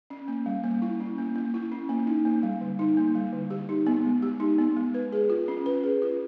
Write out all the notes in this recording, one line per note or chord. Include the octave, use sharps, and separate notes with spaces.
C#4
A#3
G3
A#3
E4
C#4
A#3
A#3
E4
C#4
A#3
D#4
A#3
G3
D3
D#4
A#3
G3
D3
G4
D#4
B3
G#3
G4
D#4
B3
G#3
B4
G#4
F4
C#4
B4
G#4
F4